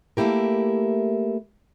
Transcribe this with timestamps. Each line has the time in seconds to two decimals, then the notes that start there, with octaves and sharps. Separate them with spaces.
0.17 A3 A#3 E4 G4 A#4